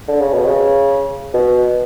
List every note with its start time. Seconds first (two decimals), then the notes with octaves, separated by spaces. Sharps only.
0.08 D3
0.21 C#3
0.33 B2
0.46 C#3
1.34 B2